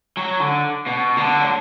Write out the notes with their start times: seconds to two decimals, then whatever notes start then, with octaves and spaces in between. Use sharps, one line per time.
0.17 F#3
0.40 D3
0.86 B2
1.17 D3
1.40 F#3